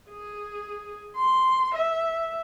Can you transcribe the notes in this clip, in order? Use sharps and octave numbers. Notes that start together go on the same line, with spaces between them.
G#4
C6
E5